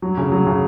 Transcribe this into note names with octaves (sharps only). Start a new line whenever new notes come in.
F#3
C#3
F#3
C#3